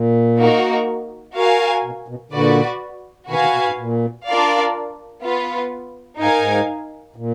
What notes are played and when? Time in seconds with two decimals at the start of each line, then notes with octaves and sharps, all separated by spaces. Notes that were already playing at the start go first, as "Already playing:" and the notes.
Already playing: A#2
0.38 A#3 D#4 F#4 A#4
1.36 F#4 A#4 F5 G#5
1.84 B2
2.08 B2
2.32 A#2 D3 F#4 B4 D5
3.29 B2 D#3 F#4 B4 F5 G#5
3.41 B2 D#3
3.53 B2
3.66 G#2
3.77 A#2
4.26 D4 F4 A#4 D5 F5
5.23 B3 F4 B4
6.19 G#2 D#4 A#4 F5 G#5
6.37 G#2
7.16 A#2